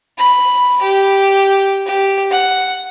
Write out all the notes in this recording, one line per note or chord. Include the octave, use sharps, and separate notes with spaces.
B5
G4
G4
F#5